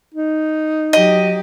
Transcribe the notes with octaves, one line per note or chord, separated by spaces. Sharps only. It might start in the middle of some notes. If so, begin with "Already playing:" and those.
D#4
F#3 G4 D#5